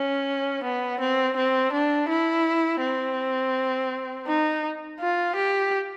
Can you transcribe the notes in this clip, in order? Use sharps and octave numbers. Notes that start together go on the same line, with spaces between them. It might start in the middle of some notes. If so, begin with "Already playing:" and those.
Already playing: C#4
B3
C4
C4
D4
E4
C4
D#4
F4
G4